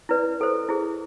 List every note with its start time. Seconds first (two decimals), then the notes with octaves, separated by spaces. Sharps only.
0.09 E4 B4 D5
0.40 E4 A4 C5
0.69 E4 G#4 C5